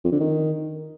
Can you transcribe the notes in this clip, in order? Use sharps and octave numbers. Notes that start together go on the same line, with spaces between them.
F2
D3
D#3